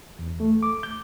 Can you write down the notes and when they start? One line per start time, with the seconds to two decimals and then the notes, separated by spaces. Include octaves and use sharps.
0.19 E2
0.40 A3
0.63 D6
0.83 G6